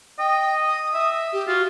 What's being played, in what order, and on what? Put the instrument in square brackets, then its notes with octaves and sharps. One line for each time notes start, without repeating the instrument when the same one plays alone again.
[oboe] D#5 [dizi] G5
[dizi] D#6
[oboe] E5
[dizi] G4
[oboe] F4 [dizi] F#4